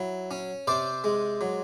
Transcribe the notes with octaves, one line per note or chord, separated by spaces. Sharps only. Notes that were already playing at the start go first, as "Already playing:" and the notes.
Already playing: F#3 E4
C#4
C3 C5 D5
G#3
F#3